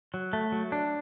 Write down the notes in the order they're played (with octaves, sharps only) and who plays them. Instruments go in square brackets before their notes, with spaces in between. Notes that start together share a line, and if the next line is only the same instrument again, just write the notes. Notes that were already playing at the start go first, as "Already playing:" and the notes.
[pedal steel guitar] F#3
A3
F#3
D4